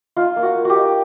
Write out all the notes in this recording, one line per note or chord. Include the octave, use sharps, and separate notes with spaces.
D#4 F4
A#3
F#4
A#3
F#4 G4
D#4